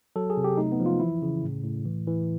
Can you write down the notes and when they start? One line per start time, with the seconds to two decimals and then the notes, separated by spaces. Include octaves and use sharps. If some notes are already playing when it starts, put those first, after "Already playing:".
0.16 F#3 A4
0.30 G#4
0.37 C3
0.44 G4
0.57 A3 D#4
0.72 B3
0.80 F3
0.86 F4
1.00 E3 E4
1.22 C#3
1.43 A2
1.64 A2
1.85 E3
2.07 E3